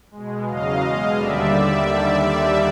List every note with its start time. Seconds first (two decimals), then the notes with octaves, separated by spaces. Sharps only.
0.11 G#3
0.16 B2
0.47 E2 C#3 F#3 D#5 F5
0.83 B2 G#3
1.17 D#2 D3 G3 D5 E5